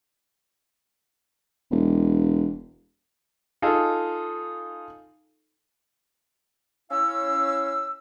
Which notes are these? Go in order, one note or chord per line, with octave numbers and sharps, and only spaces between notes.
E1
D#4 F4 G#4 A4
C#4 E4 F5 E6